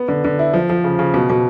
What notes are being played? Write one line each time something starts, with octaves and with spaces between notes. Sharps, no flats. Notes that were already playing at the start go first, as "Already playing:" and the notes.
Already playing: B3
D3
D3
E4
F3
F3
C#3
C#3
B2
B2